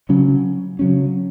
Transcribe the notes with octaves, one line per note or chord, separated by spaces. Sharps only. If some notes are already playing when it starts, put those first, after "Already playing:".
C#3 F#3 C#4
C#3 F#3 C#4